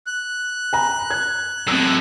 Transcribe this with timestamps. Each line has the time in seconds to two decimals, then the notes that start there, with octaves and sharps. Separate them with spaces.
0.06 F#6
0.73 G#5 A#5 B5
1.10 G#6
1.68 F#2 A2 C4 E6